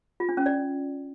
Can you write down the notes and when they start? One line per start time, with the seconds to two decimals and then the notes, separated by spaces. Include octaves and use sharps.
0.20 F4
0.29 D4
0.37 C#4
0.46 D5